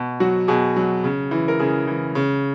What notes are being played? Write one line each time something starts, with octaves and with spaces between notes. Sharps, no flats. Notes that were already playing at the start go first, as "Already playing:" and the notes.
Already playing: B2
F#3 F#4
B2 G#4
F#3
C#3
E3
A#4
C#3 G#4
E3
C#3